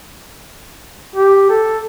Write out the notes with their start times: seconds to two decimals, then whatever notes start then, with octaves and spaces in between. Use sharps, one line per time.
1.16 G4
1.50 A4